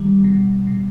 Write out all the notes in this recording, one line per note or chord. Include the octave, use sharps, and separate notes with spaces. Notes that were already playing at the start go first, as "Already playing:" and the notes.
Already playing: D#3 G3
B2
B2